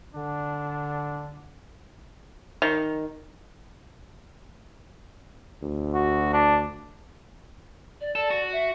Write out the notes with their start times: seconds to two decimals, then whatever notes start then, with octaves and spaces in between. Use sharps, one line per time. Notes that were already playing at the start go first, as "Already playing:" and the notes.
0.15 D3 D4
2.62 D#3
5.62 D2
5.94 F#4
6.33 D4
8.01 D5
8.15 A4 D5
8.31 F#4
8.52 E5